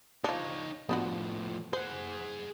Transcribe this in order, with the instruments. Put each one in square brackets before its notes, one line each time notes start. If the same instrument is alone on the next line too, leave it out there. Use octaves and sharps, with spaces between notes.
[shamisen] F3 D4 [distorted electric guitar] D#4 C#5
[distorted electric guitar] A2 F3 [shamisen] B3 D4 F#4
[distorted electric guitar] G#4 F#5 [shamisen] C5